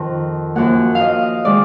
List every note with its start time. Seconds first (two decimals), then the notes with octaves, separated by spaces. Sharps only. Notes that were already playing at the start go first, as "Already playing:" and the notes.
Already playing: F2 D#3 A#5
0.55 F#2 F3 A#3 F#5
0.95 F5
1.01 D#5
1.45 D#3 G#3 D5